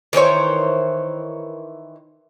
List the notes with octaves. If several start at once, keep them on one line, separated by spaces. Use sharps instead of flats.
D#3 E3 C5 C#5